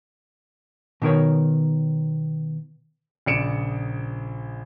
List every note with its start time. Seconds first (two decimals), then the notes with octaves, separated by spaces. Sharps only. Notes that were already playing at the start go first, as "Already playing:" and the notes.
1.02 B2 D#3 A#4 C#5
3.26 A#1 C#3 D5 C#7 D7 E7